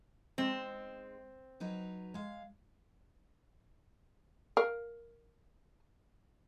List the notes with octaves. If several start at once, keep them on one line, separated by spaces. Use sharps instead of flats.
G#3 C4 D#4
F#3 D#4 B4
G#3 F5
A#4 F5